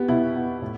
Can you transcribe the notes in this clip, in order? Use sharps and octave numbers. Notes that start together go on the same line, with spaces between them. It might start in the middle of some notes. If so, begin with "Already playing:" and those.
Already playing: B3 G4
B2 E4
B3
A2